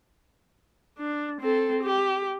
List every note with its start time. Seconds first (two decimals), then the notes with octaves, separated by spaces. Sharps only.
0.98 D4
1.41 C4 A4
1.83 G4